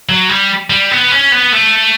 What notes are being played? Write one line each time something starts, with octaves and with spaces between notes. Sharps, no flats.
F#3
G3
G3
B3
C#4
B3
A3